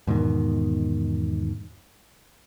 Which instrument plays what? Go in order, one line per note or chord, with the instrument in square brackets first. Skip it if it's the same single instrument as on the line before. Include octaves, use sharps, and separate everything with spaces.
[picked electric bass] E2 G#2 B2 D#3